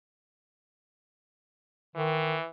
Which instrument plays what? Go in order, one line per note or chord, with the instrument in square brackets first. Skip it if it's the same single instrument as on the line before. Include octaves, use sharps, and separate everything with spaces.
[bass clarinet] D#3 [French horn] E3